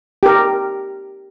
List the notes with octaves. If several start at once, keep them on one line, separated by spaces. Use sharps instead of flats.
G4 A#4